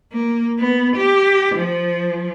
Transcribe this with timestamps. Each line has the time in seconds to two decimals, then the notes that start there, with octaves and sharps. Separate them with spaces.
0.12 A#3
0.59 B3
0.96 G4
1.55 F3